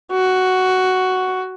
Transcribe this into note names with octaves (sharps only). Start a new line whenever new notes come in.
F#4